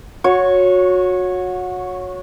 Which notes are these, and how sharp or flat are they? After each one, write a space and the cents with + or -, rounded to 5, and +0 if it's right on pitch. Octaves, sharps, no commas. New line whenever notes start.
F#4 -25 C#5 +0